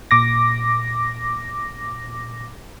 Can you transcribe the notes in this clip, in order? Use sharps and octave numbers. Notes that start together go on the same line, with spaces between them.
A#2 D6 A#6